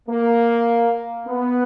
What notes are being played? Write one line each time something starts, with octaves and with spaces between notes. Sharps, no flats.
A#3
B3